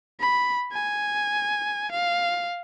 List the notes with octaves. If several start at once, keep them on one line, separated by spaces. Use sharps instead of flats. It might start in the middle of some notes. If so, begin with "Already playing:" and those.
B5
G#5
F5